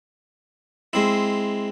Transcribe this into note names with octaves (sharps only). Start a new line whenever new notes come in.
G#3 C4 E4